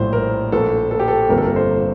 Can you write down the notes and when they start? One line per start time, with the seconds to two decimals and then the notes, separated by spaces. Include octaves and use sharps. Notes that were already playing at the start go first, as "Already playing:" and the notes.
Already playing: A#1 A2 G3 C5
0.13 A#4
0.52 A#1 A#2 A3 A4
0.91 A4
0.99 G4
1.08 A4
1.29 G1 F2 D3 F3 A#3 A#4
1.38 A4
1.45 A#4
1.56 C5